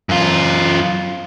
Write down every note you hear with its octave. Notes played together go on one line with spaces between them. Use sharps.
F#2 F4